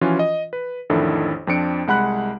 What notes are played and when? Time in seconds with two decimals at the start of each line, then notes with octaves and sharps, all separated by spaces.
0.01 E3 F3 C#4 F4 F#4
0.19 D#5
0.53 B4
0.90 A1 F2 D#3 D4 E4 A4
1.47 F2 F3 C4 D4 C#7 D7
1.87 C2 G#3 F#5 B5 F#6